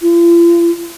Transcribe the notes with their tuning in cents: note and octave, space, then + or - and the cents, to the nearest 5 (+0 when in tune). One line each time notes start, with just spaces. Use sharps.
F4 -40